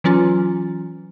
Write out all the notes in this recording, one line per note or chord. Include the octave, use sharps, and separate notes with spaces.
E3 F#3 C#4 F4